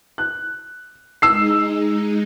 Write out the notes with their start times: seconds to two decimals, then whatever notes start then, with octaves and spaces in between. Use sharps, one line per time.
0.18 F#6
1.22 G#3 D#4 E6 C7